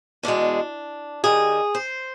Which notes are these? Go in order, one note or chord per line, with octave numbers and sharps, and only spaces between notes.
E2 B2 G#3 D4
D#2 D#3 G3 G#4
C5